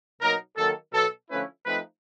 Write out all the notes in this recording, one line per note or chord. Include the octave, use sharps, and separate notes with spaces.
B2 F#3 A#3 D#4 A#4
D#3 F#3 A#3 A4
B2 F#3 B3 A4
D3 F3 A3 C#4 E4 B4
F3 A3 C4 D#4 B4